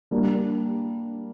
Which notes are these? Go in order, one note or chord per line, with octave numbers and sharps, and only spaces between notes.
G3 A#3 D4 G4 A#4